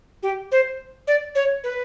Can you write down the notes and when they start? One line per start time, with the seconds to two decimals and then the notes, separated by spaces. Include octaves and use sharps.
0.23 G4
0.52 C5
1.07 D5
1.35 C#5
1.64 B4